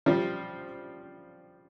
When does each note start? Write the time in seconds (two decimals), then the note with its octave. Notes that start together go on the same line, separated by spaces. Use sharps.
0.06 F3 G3